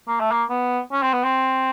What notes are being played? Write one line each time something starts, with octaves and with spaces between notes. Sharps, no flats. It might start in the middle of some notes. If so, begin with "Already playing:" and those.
A#3
A3
A#3
B3
C#4
C4
B3
C4